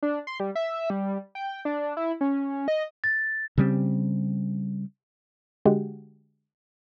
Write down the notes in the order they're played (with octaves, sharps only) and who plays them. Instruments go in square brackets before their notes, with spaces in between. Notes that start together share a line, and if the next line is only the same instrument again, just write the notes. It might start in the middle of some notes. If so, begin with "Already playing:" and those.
[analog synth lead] D4
C6
G3
E5
G3
G5
D4
E4
C#4
D#5
[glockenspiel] A6
[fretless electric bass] C#3 G3 C4
[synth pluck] D3 G#3 F#4 G4